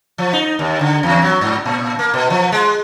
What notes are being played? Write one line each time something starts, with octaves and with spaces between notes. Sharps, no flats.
F3
D#4
D#2
D3
E2
F#3
G#2
A#2
A#3
B2
F3
G#3